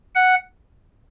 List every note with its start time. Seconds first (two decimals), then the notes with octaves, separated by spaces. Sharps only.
0.15 F#5